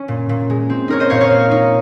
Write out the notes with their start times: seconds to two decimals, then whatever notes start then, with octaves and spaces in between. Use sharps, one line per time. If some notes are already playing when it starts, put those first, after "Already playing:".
Already playing: C#4
0.08 A#2
0.29 A#2
0.50 G#3
0.70 C4
0.88 D#4 A#4 C#5
1.00 C5 D#5
1.10 A#2 C#5 F5
1.20 C#5 F5
1.31 A#3
1.51 D#4